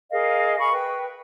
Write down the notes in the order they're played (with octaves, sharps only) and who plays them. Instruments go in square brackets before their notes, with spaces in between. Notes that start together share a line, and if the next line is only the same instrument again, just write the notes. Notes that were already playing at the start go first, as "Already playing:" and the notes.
[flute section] G#4 A#4 D#5 F5
F5 G#5 B5 C#6
B4 G5